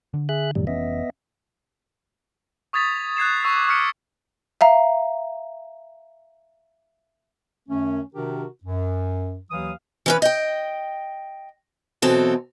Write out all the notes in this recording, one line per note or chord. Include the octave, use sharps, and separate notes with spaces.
D3
G#4 E5 F#6
F#2 A2 C3 D#3 F#3 G3
F1 E3 B3 C#4 D#5 E5
C#6 D#6 G#6 A6 B6 F7
F#6 G#6 C7 E7
C#6 E6 C7
D6
C#6 D6 F6 B6 C#7 D7
E5 F5 A#5
F#2 D#3 A3 C#4
C3 D#3 D4 F#4 G4 A#4
F#2
D#2 E3 F#3 F5 D#6
E3 C#4 B4
D#5 G5
B2 E3 F#3 C4 A4